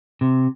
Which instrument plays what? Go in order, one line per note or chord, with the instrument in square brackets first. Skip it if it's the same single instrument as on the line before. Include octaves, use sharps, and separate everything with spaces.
[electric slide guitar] C3